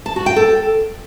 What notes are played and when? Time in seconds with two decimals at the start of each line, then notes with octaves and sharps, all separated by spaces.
0.06 A5
0.16 F#4
0.26 G5
0.36 A4